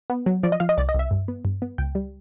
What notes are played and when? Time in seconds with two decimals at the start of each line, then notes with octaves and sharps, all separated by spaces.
0.10 B3
0.26 F#3
0.43 F3 D5
0.52 D#5
0.60 F3 F5
0.69 D#5
0.77 C2 D5
0.89 D#5
0.95 C2 E5
1.11 G2
1.28 B3
1.45 G2
1.62 B3
1.78 C#2 G5
1.95 G3